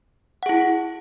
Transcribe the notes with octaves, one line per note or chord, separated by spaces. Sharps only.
E4 G#4 F#5